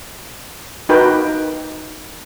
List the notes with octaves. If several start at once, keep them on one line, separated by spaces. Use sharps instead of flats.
D#4 F#4 A#4 B4 G5